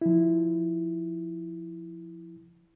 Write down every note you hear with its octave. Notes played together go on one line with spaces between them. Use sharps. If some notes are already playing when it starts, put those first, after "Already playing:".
F3 E4